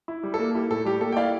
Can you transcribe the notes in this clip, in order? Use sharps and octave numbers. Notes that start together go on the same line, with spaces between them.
E4
G3
A4
A#3
E4 G4
A2 A4
G3 G4
A#3 A4
G5
E4 D5 F5